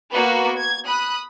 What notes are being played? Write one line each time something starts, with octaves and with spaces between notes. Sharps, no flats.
A#3 B3 F#4 B4
G#6
B5 D#6 F#6